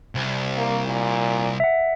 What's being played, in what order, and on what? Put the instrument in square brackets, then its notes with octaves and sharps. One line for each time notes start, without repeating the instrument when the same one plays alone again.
[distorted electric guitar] C2
[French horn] A#3
A#2
[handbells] E5 F#5